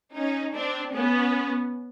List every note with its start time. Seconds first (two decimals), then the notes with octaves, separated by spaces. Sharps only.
0.15 C#4 D#4
0.55 C4 D4
0.94 B3 C#4